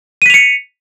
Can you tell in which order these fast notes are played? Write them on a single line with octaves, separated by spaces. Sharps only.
D#7 B6 F7 C#7